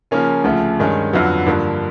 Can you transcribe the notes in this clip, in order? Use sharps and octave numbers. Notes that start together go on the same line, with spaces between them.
C#3 F3 A#3 C#4 F4
D2 C#3 F3 A3
G2 D#3 G#3 C#4
F2 D3 F#3 B3
G2 D3 F3 A#3